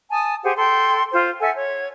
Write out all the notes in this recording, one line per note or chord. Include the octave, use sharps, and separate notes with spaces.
G#5 A5 D#6
G4 G#4 C5 F#5
A4 G5 C6
F4 C5
A4 E5 F#5 G#5
C#5